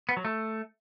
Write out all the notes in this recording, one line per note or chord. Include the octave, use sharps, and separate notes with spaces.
B3
F#3
A3